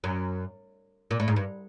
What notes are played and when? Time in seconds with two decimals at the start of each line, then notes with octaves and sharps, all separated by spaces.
0.04 F#2
1.11 A#2
1.20 A2
1.28 G#2
1.36 G2